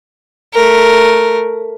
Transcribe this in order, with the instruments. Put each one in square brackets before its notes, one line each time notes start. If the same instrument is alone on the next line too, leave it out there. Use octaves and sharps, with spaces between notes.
[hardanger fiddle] A3 A#4